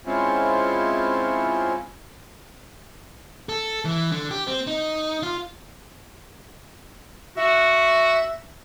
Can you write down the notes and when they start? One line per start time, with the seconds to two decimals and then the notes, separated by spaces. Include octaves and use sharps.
0.06 G#3 C4 C#4 E4 F4
3.49 A4
3.85 E3
4.12 D3
4.31 G4
4.47 C4
4.67 D#4
5.23 F4
7.37 F#4 E5